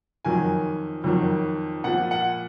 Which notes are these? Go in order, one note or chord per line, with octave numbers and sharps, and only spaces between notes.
F2 D#3 F#3 G#5
F2 D#3 F#3
A#2 F3 F#5
F#5